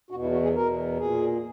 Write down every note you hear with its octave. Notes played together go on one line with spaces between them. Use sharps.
E2 B2 F#4
E4
F#4
G#4
E2 B2 A#4
A#2 G#4